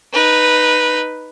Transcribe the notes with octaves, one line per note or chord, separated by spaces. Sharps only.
D#4 B4